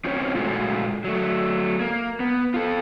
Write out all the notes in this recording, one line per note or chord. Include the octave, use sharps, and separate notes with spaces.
C4 C#4 F4 C5 C#5
A#2 G#3 A3 F4 F#4
F#3 A3
A#3
B3
F4 A4